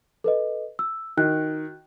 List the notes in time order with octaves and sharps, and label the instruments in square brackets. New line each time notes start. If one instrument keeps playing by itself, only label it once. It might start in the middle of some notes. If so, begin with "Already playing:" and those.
[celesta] A4 B4 D#5
E6
[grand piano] D#3 [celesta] F#4 F#6